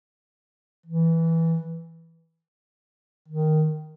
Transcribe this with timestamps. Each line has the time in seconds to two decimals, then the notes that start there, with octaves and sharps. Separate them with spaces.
0.86 E3
3.28 D#3